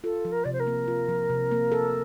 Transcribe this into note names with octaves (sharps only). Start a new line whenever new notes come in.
F4 A4
F3
A#4
C3 D5
C5
A#4
A#3
F4
F3
C3
A#3
A4